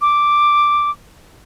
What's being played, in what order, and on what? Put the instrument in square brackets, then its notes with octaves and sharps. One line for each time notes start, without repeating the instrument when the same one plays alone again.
[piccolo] D6